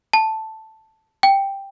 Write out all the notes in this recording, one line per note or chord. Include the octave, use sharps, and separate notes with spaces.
A5
G5